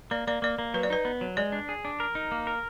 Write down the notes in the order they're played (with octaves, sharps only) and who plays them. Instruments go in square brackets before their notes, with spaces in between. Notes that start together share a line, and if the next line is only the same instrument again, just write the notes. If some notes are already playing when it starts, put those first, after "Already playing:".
[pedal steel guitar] A#3 [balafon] D5
[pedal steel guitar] A#3 [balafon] D5
[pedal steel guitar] A#3 [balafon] D5
[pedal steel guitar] A#3
[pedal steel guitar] F#3 [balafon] B4
[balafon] D5
[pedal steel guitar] D#4 [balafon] B4
[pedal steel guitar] B3
F#3
[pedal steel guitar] G#3 [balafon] D5
[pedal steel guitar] D4
G#4
D4
A#4
D#4
A#3
A#4